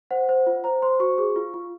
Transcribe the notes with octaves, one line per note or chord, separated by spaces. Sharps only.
C5 F#5
C5
F4
C5 A#5
C5 C6
F#4 C#6
G#4
F4
F4